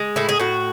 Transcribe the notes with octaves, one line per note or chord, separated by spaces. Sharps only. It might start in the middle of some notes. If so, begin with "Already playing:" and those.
Already playing: G#3
A2 E4
G#4
A2 F#4